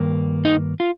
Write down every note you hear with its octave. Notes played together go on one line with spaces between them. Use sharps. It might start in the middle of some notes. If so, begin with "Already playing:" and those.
Already playing: G2 D#3 A#3
D#4
F4